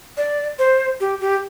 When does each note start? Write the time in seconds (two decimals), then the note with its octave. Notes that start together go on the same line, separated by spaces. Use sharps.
0.17 D5
0.59 C5
1.00 G4
1.21 G4